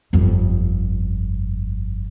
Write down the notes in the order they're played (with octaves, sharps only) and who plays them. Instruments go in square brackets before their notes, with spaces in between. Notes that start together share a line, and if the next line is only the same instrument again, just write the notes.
[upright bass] G1 F2